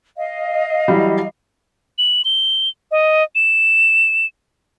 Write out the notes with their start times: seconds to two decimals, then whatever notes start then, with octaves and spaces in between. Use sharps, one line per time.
0.16 D#5 F5
0.88 E3 F#3 G3
1.98 F#7
2.25 G7
2.91 D#5
3.35 E7